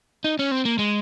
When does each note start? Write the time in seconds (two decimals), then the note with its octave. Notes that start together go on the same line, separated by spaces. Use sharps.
0.24 D#4
0.39 C#4
0.51 C4
0.65 A#3
0.79 G#3